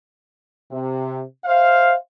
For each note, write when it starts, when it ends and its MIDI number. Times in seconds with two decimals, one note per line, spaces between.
0.72 1.21 48
1.45 1.94 72
1.45 1.94 76
1.45 1.94 77